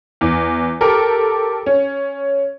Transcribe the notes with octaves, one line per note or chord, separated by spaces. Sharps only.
E2
G4 A4 A#4
C#4